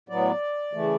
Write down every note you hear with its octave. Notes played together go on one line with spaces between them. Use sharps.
A2 F#3 B3 D5
C#3 E3 A3